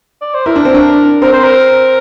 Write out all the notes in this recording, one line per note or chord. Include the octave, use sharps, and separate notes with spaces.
D5
C5
E4 A#4
D4
C4
D4
C4 A#4
C5
A#4